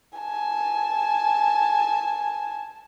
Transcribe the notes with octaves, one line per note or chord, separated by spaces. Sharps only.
G#5 A5